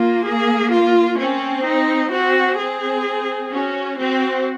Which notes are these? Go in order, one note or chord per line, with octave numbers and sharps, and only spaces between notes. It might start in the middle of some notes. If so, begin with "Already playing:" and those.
Already playing: A#3 F4
G#4
F4
C4 C#4
D#4
C4 F#4
C4 G#4
C#4 F#4
C4 F#4